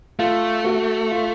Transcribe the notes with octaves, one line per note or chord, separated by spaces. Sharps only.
A3 F4
F#4
F4